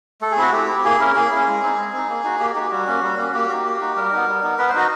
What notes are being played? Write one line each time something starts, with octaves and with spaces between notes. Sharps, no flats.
A3 A4
G#4
C4 E4 F#4
A3 G4
C4 E4
A#3 G#4
C#4 E4 A#4
A#3 G#4
C#4 E4
G#3
C4 D#4
G#3
C4 D#4
A#3
D#4 F#4
A#3 G4
D#4 F#4 G4
G3 F#4
A#3 C#4
G3
A#3 C#4
A#3 G4
D#4 F#4
A#3
D#4 F#4
G3 A#4
B3 D#4
G3
B3 D#4
B3 B4
C5
D#4 F#4 D#5